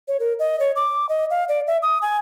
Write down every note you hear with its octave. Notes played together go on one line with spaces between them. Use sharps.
C#5
A#4
D#5
C#5
D6
D#5
F5
D5
E5
D#6
G#5